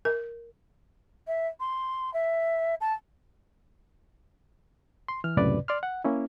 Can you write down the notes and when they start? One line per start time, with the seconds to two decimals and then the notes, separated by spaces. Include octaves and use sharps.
0.05 A#4
1.27 E5
1.60 C6
2.14 E5
2.81 A5
5.08 C6
5.24 E3 F6
5.37 C#2 F#2 A2 C3 B4 D5
5.68 D5 C6 F6
5.83 F#5
6.04 A#3 C#4 E4